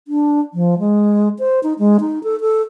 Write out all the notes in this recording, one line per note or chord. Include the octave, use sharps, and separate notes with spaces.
D4
F3
G#3
C5
D#4
G#3
D#4
A4
A4